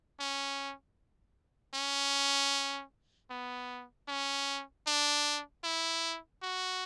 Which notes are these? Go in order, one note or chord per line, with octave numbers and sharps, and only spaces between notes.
C#4
C#4
B3
C#4
D4
E4
F#4